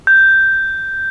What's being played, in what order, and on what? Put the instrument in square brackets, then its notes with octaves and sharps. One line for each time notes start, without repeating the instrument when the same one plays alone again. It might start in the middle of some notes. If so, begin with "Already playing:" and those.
[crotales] G6